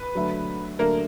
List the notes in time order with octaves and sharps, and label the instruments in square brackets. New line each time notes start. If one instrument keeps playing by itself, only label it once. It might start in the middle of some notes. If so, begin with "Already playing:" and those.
Already playing: [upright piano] B4
[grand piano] D3 F#3 A3
[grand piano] D3 F#3 A3 [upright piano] A#3 A#4